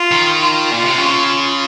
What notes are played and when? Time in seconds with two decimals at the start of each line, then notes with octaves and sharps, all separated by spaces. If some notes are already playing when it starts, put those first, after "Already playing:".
Already playing: F4
0.11 D#3
0.40 F4
0.71 A#2
0.85 C3
0.98 C#3